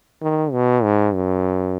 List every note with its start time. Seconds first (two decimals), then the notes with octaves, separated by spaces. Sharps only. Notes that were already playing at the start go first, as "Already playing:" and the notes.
0.22 D#3
0.52 B2
0.84 G#2
1.14 F#2